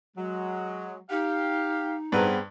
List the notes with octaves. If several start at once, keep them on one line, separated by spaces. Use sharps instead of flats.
F#3 G#3
D#4 G4 F5
G2 B3 C4 G#4 B4 A#5